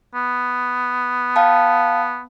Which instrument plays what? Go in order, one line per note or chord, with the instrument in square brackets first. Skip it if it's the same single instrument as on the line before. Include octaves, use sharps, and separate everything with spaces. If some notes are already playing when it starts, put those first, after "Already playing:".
[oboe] B3
[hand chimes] F5 G5 A5